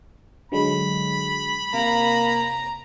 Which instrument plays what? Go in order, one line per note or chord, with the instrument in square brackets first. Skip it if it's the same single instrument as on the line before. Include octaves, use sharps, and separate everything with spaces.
[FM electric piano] D3 F#3 G#3 [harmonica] B5
[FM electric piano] C3 [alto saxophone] A#3 [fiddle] A#5